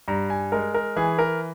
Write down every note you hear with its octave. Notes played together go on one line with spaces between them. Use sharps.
G2 A#5
G#5
G#3 A#4
A#4
E3 G#4
A#4